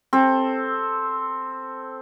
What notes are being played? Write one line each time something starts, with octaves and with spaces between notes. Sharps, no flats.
C4 A4